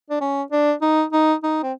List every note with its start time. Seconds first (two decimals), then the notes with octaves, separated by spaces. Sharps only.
0.10 D4
0.21 C#4
0.52 D4
0.82 D#4
1.12 D#4
1.43 D#4
1.63 C4